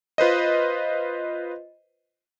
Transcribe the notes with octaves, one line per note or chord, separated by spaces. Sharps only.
F4 B4 C5 D#5